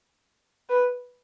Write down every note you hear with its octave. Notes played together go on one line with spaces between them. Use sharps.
B4